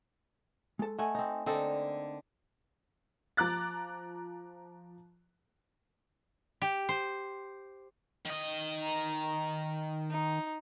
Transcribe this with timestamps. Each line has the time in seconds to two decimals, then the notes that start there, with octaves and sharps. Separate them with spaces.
0.79 G#3 A4
0.99 A3 D#5 F#5 G#5
1.15 C4 D#4
1.46 D3 A#3 C4 D4 D#4 A4
3.37 F3 A#5 D6 F#6 A6
6.62 G4
6.89 C5
8.25 D#3 D#5
8.82 A#5
10.10 D#4